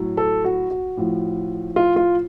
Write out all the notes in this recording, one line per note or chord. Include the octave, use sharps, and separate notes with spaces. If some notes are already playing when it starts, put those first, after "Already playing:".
Already playing: A2 F#3
A4
F#4
F#4
A2 F3
F4
F4